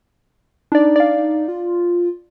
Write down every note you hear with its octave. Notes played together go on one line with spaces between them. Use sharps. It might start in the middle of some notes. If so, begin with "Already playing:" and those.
D4 D#4 D5
D5 F5
F4